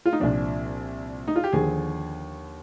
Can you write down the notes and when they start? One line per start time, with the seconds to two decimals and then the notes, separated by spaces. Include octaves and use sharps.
0.05 F4
0.13 D#4
0.20 C2 A#2 F3 D4
1.28 D#4
1.36 F4
1.44 G4
1.52 D#2 D3 F3 G#4